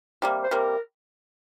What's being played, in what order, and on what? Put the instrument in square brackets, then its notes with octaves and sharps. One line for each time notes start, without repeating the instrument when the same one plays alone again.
[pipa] C3 G3 A#3
[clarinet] C5
[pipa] C3 G3 A#3 [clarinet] A#4